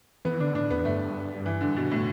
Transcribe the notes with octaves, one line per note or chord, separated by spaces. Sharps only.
E3 B3
D3 D4
A2 D4
E2 B3
G2 A3
E3
D3
B2
A2